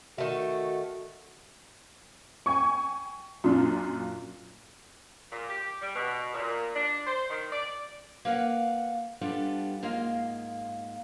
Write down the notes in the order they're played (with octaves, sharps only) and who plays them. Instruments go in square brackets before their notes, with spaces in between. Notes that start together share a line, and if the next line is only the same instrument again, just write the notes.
[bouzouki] D#3 A3 [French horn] F#4
[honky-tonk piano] G5 G#5 C#6
F#2 A#2 D4 F4
[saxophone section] A#2
G4
G3
B2
A#2
D4
C5
D#3
D5
[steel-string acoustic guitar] A#3 A#4 B4 D5 F5 F#5
G3 B3 D4 F4 G4 A4
G#2 A#3 F4 D#5 F5